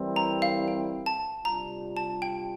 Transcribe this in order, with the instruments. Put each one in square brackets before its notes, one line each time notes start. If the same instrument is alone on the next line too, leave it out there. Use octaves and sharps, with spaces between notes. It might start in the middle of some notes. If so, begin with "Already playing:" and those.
Already playing: [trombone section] E3 G3 C4 E4 A#4
[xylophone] A#5
F5
G5
A5
[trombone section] C3 G3 D4 F4 [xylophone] A#5
[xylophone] A5
G5